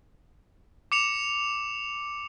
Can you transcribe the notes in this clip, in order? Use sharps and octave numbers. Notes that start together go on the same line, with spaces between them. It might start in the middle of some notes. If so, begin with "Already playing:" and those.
D6 C#7 F7